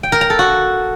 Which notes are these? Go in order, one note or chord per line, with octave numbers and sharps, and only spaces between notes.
G5
A#4
A#5
A4
F#4